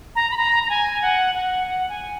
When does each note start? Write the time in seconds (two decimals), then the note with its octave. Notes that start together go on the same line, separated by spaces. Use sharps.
0.16 A#5
0.31 B5
0.37 A#5
0.63 A#5
0.69 G#5
1.02 F#5
1.35 F#5
1.67 F#5
1.89 G#5